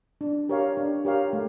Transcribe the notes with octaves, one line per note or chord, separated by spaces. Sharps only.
D4
G4 A#4 C#5 F5
D4
G4 A#4 C#5 F5
A3